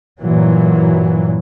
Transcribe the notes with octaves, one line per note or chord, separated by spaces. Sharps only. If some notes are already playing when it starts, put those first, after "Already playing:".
G2 A#2 E3 F#3